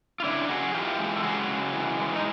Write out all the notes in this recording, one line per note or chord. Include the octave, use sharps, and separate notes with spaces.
F4
C#3 D4 E4
C#3 F#4 G#4
E3 F4 G4
G#3
A4
C#3 F#4 G#4
C#3
E3
G#3
D#4